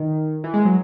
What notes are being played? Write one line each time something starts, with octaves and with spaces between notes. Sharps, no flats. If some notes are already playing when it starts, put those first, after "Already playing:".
Already playing: D#3
E3
G#3
F#3